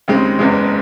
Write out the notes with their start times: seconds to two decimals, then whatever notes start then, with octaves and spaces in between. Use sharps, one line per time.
0.08 D#2 C#3 G#3 C4
0.39 F#1 E2 C#3 G#3